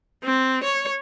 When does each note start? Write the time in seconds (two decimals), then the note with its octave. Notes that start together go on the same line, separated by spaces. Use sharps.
0.23 C4
0.64 C#5